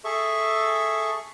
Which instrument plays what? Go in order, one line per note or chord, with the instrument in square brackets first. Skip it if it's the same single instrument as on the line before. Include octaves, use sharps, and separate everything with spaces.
[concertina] G#4 A4 E5 C#6